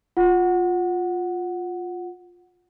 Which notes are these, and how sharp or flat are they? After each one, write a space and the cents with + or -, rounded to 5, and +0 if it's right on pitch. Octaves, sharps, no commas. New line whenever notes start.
F4 +15 F#5 +0